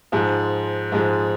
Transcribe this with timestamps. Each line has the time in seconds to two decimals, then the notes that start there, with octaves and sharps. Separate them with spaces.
0.12 G#2 F3 G#3
0.92 G#2 F3 G#3